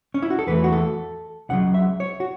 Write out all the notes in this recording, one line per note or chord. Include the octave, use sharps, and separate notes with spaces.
C#4
E4
F#4
A4
E2 E3 A3 B4
F#4
A4
C#2 C#3 F#3 F#5
E5
C#5
F#4